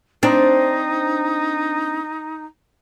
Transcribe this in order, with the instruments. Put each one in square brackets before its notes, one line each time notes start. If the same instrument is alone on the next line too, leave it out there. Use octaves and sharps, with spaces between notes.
[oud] C4 D4 [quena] D#4